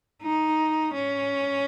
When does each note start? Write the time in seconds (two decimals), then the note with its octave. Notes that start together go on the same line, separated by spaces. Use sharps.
0.22 D#4
0.94 C#4